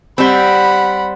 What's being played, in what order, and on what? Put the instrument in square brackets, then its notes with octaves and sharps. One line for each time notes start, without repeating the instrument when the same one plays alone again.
[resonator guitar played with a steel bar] G3 C4 [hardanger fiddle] F#5 B5